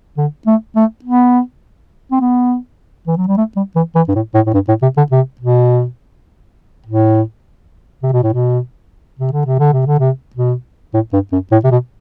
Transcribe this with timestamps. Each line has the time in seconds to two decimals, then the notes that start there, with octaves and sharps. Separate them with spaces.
0.17 D3
0.46 A3
0.76 A3
1.04 B3
2.11 C4
2.21 B3
3.07 E3
3.17 F#3
3.27 G3
3.37 A3
3.56 G3
3.76 E3
3.95 E3
4.08 G2
4.15 A2
4.34 A2
4.46 A2
4.54 G2
4.68 A2
4.82 C3
4.97 D3
5.11 C3
5.41 B2
6.86 A2
8.03 C3
8.12 B2
8.23 A2
8.33 B2
9.19 C3
9.32 D3
9.46 C3
9.59 D3
9.72 C3
9.86 D3
9.99 C3
10.36 B2
10.94 A2
11.13 G2
11.32 F#2
11.51 A2
11.64 C3
11.71 B2